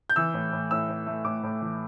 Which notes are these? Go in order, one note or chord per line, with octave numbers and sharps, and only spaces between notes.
G6
E3 E6
A2
A2
A2 E6
A2
A3
A2 D6
A2
E3